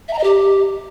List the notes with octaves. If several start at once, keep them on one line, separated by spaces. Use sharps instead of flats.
E5
A#5
D#5
G4